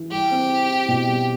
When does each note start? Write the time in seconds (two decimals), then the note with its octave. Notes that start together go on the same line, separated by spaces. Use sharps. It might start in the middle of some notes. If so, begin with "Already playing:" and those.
Already playing: E3
0.11 G3 G4
0.31 C4
0.50 E4
0.69 E4
0.88 B2
1.08 G3